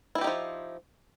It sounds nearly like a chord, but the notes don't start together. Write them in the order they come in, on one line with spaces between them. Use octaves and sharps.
E4 E3 G4 D#4 F3